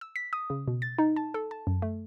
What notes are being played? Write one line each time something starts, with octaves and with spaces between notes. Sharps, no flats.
E6
B6
D#6
C#3
B2
A6
D#4
A5
A4
A5
F#2
A3